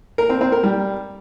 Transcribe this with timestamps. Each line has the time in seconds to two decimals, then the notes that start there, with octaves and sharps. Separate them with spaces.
0.18 A#4
0.30 C4
0.41 C4
0.52 A#4
0.64 G3